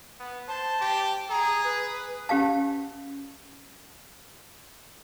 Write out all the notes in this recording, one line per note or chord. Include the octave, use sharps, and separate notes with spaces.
B3
C5 A5
G4
G#4 A#5
B4
C#4 G4 F5 A5